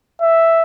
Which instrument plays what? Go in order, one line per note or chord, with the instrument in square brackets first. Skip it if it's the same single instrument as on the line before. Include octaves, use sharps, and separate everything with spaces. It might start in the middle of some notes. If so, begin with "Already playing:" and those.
[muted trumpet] E5